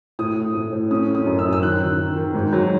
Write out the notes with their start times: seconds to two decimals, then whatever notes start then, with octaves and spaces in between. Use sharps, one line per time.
0.19 A2 D#6
0.37 A2
0.54 A2
0.73 A2
0.91 C#4 D#6
1.09 C#4
1.15 D#6
1.27 F#2
1.39 E6
1.45 F#2
1.53 E6
1.63 D#3 F#6
1.80 D#3
1.99 D#3
2.16 D#3
2.34 G#2
2.53 F#3